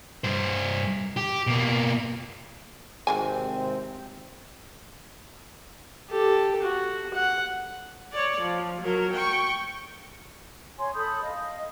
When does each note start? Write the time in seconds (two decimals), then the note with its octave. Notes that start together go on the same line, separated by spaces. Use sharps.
0.24 G2 C5
1.17 G4
1.47 B2 A#3
3.07 G#1 C3 D#3 G#3 C4 G#5
6.10 G4 A4
6.62 F#4
7.14 F#5
8.12 C#5 D5
8.41 F3
8.82 F#3 A#4
9.13 G5 C#6
10.79 C#5 G#5 C6
10.95 A4 B5 D#6 G6
11.23 D#5 F5